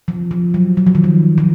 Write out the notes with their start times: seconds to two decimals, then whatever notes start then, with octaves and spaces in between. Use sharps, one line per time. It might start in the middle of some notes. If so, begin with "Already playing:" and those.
0.08 F3
0.31 F3
0.54 F#3
0.77 F#3
0.87 F3
0.95 D#3
1.04 F3
1.38 F3